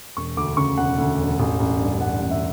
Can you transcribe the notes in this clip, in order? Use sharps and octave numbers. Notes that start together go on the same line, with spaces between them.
E1 C#6
D2 D6
C#3 C#6
E1 F#5
D2
E1
A1
A1
G2
G2 F#5
A1
E5